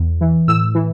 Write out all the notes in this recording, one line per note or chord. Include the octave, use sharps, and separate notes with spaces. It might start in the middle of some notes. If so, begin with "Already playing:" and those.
Already playing: E2
E3
A2 E6
E3